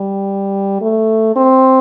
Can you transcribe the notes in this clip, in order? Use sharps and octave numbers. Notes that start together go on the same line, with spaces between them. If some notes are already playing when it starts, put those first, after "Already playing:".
Already playing: G3
A3
C4